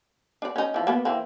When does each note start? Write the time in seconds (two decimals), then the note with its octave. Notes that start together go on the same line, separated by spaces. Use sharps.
0.42 D4 D5
0.56 C#4 D#4
0.74 E3 F3
0.87 A#3 B3
1.05 E3 A#3 C4